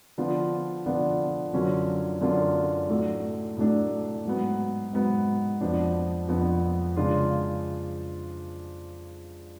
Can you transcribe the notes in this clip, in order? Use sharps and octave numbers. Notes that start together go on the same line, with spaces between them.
D3 F3 B3 D4 F4
D3 F3 B3 D4 F4
F#2 D3 F#3 C#4 F4
F#2 D3 F#3 C#4 F4
A2 F#3 A3 D4
A2 F#3 A3 D4
G#2 F#3 B3
G#2 F#3 B3
F2 F3 B3 D4
F2 F3 B3 D4
C#3 G#3 D4 F4